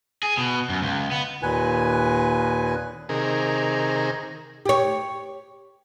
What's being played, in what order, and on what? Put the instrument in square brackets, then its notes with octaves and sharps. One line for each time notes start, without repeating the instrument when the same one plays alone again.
[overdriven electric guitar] G#4
B2
F#2
C#2
B3
[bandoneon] D#2 A#2 B4 G#5
[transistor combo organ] C3 D#3 G#4 A#4
[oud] G4 C#5